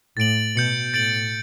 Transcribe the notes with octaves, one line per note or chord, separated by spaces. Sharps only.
A2 A6 D7 F#7
B2 G6 C#7 F#7
A2 A6 D7 F#7